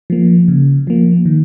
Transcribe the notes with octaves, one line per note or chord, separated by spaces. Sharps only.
F3 A#3
C#3
F3 A#3
D#3